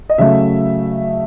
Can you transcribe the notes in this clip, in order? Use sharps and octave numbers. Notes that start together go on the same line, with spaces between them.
D#5
C#3 F#3 A3 E5